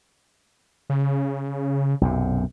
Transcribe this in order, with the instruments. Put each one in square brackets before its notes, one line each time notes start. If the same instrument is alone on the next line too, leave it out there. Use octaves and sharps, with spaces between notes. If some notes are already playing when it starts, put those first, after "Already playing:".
[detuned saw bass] C#3
[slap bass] B1 F#2 C3